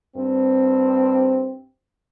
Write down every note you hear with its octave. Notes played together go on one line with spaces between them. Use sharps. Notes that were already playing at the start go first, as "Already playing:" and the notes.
G2 C4